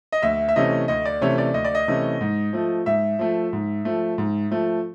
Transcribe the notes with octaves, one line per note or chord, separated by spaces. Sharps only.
D#5
D2 E5
E5
C3 E3 A3 C#4 D#5
D2 D#5
D5
C3 E3 A3 C#4 C#5
D5
D2 D#5
D5
D#5
C3 E3 A3 C#4
G#2
F3 A3
G#2 E5
F3 A3
G#2
F3 A3
G#2
F3 A3